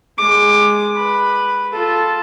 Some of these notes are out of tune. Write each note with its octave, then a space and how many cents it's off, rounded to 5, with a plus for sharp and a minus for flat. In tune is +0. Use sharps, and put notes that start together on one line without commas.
G#3 +0 D6 +20
B4 +0 B5 +0
F4 +0 A4 -5